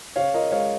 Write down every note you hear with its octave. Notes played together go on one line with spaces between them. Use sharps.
C#3 C#5 F5
F4 A#4 D#5
G#3 C#5 F5